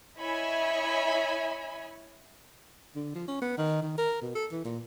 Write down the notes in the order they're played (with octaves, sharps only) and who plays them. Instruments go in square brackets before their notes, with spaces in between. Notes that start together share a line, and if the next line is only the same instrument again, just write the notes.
[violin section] E4 C#5 D#5 E5 G#5 B5
[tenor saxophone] D3
F3
C#4
B3
D#3
D#3
A#4
B2
A4
E3
A#2